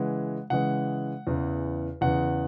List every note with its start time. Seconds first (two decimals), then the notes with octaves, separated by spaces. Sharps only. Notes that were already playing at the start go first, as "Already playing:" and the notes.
Already playing: C#3 E3 G#3 F#5
0.50 C#3 E3 G#3 F#5
1.27 E2 C#3 E3
2.01 E2 C#3 E3 F#5